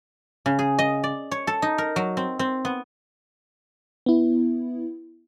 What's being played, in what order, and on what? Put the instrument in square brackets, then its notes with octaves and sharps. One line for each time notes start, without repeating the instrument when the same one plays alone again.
[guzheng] C#3
G#4
D#5
D5
C#5
A4
D#4
A#4
F#3
C4
C4
B3
[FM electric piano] B3 E4